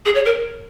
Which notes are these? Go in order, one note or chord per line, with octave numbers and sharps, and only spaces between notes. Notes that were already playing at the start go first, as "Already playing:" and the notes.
G#4
C#5
A#4